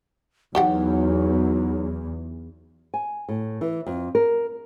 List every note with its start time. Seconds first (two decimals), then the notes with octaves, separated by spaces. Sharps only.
0.55 E2 F#3 D#4 F#4 G4 F#5
2.94 G#5
3.29 A2
3.61 E3
3.87 F2
4.15 A#4